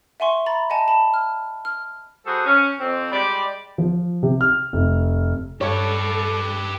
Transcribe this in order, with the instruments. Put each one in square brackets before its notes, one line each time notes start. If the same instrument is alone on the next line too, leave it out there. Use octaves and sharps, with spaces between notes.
[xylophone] E5 F#5 G#5 C6 C#6
A#5 B5 A6
D#5 F#5 G#5 A5
A5 B5
F6
F6
[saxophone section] G3 F#4 G#4 A4 C5
C#4
F2 C4
G3 G#3 G4 D5
[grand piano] F3
C3
F6
F1
[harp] G2 [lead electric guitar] G4 B4 [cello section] A4 [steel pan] C#5 C#6